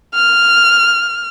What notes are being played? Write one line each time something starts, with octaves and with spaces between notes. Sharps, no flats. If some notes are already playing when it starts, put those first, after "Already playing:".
F6